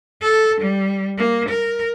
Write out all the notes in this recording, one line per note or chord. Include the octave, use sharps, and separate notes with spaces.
A4
G3
A#3
A#4